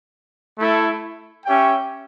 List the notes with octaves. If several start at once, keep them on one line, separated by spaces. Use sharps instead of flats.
A3 E4 A4
C#4 G4 C#5 E5 G5